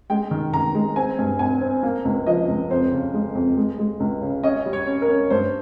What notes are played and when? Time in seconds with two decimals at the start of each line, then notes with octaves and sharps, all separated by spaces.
0.10 G#3 G5
0.31 D#3
0.53 D#3 A#5
0.74 G#3
0.96 C4 G#5
1.19 G2
1.39 G#1 G#5
1.61 C4
1.83 A#3
2.05 C#2
2.27 F3 D#5
2.48 C#2
2.70 F2 C5
2.92 C#3
3.14 G#3
3.35 F2
3.57 G#3
3.78 G#3
4.00 C#2
4.22 C#3
4.44 C#4 D#5
4.66 G3
4.73 C#5
4.87 C#4
5.02 A#4
5.09 C#4
5.30 G2 C5